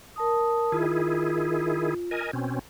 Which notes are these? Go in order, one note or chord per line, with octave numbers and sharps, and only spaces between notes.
A#4 A5 D#6
D#3 E4 F4 G#4
A#4 D#5 G#5
B2 C4 C#4